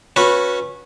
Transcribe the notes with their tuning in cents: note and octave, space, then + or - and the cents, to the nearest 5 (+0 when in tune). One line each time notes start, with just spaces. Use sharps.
C#4 +0 F#4 -20 B4 -15